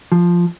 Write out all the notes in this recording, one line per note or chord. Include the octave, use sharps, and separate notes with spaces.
F3